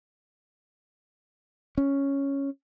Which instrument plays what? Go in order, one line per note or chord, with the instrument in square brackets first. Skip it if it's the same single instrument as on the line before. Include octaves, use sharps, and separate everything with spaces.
[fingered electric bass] C#4